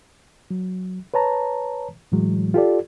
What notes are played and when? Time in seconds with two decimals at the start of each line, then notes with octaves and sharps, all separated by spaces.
0.51 F#3
1.14 B4 C#5 A5 A#5
2.12 A2 E3 F#3 G#3
2.54 F4 G4 A4 D5